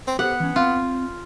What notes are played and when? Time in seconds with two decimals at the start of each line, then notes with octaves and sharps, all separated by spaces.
0.07 C4
0.19 B3 G4 A4 C5 F#5
0.40 E3 C#4
0.56 C4 F4